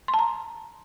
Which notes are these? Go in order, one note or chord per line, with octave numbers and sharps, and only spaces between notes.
C6
A5
A#5